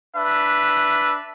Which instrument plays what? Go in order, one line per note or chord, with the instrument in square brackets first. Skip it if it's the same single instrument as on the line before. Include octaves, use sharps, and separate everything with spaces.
[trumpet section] D4 B4 E5